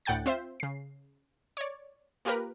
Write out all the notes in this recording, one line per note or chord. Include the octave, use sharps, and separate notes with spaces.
D2 A2 F#5 G5 G6 A6
C4 F4 C5 E5
C#3 C7
C#5 D5
A#3 F4 G4 A#4 B4